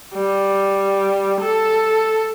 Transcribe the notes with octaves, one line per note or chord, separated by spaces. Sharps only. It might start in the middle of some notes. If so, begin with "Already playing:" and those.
G3
A4